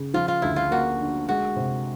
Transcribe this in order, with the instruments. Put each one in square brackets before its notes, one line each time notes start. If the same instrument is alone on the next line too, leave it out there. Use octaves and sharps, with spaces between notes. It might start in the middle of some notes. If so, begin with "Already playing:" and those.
Already playing: [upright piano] C#3
[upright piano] F3 [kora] F4
[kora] F4
[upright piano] D2 [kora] E4
[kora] F4
[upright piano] A#3 [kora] F#4
[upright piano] D3
[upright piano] G#3 [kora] F#4
[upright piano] C3